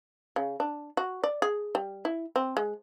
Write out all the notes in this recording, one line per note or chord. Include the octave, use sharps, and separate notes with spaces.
C#3
D4
F#4
D5
G#4
G3
E4
C4
G#3